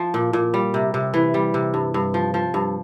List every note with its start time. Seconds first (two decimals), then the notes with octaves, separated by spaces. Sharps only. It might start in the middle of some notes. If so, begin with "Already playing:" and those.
Already playing: F3
0.14 A#2
0.33 A#2
0.54 G3
0.74 C3
0.94 C3
1.14 E3
1.34 G3
1.54 C3
1.74 G2
1.94 G2
2.14 F3
2.34 F3
2.54 G2